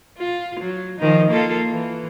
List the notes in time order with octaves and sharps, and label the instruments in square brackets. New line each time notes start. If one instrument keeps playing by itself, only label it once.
[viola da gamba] F4
F#3
D#3 F3 D#4
A#3 F4 A4
E3